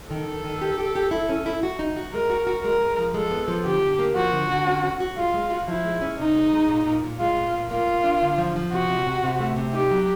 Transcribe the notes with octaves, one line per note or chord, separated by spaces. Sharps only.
D#3 A4
D#3
D#3
G4
G4
G4
E4
C#4
E4
F#4
D#4
F#4
G#3 A#4
F#4
F#4
G#3 A#4
G#3
F3
G#3 A4
B3
F3
D3 G4
D3
A#3
F3 F#4
D3
D3
C#4
C#4
F#4
G#3 F4
G#3
F#4
F3 E4
G#3
C#4
C3 D#4
G#3
G#3
A#2
A#2
A#2
G#3 F4
A#2
A#2
A#3 F4
A#3
D4
D3
F3
F3
C3 F#4
C3
C3
C3
A3
C3
D#4 G4
F#3